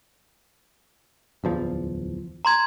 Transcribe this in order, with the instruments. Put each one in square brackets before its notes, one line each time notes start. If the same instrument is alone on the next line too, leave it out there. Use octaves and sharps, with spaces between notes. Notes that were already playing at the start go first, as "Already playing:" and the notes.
[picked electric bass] D1 E2 F3
[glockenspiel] A#5 C6 G#6